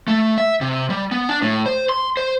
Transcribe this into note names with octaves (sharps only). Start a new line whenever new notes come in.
A3
E5
C3
G3
B3
D4
A2
C5
C6
C5